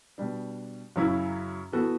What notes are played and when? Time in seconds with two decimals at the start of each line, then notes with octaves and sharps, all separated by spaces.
0.18 B2 G3 D4
0.96 F#2 C#3 F#3 C#4 E4
1.72 E3 B3 F#4 A4